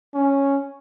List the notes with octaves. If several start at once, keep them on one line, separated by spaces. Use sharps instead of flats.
C#4